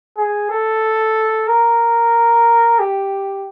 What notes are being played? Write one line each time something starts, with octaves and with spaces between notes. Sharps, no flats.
G#4
A4
A#4
G4